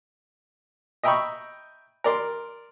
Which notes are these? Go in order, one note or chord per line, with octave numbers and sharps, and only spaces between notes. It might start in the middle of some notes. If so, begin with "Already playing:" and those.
D#5 E5 G5 A#5 B5 C#6
A#4 D5 C6